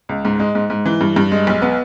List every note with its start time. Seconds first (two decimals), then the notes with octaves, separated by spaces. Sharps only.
0.09 C#2
0.25 G#2
0.39 G#3
0.55 G#2
0.70 G#2
0.86 E3
1.01 G2
1.16 G2
1.32 G#3
1.47 B1
1.62 B3